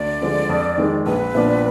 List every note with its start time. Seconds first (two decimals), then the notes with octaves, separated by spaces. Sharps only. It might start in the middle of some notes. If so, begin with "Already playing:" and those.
Already playing: D2 D5
0.22 D3 F3 G#3 D4
0.49 F2
0.78 D#3 G#3
1.06 A#1 B4
1.34 A#2 F3 B3 D4